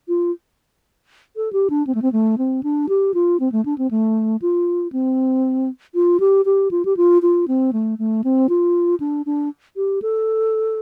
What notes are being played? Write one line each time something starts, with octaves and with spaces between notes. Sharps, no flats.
F4
A4
G4
D4
C4
A3
C4
A3
C4
D4
G4
F4
C4
A3
D4
C4
A3
F4
C4
F4
G4
G4
F4
G4
F4
F4
C4
A3
A3
C4
F4
D4
D4
G4
A4